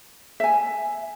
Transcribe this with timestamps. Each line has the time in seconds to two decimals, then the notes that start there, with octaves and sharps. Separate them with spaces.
0.40 E5 G#5